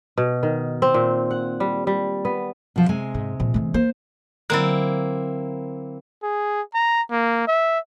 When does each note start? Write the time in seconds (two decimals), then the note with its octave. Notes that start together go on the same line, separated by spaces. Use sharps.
0.18 B2
0.43 D#3
0.82 C4
0.94 A#2
1.31 F#5
1.60 G3
1.87 G3
2.25 B3
2.76 B2 F3
2.89 C3 G#3 G#5
3.14 G#2
3.40 A#2 F3
3.54 E3 A3
3.74 A#3 C5
4.50 D3 F#3 A#3 C4 E4
6.23 G#4
6.75 A#5
7.11 A#3
7.48 E5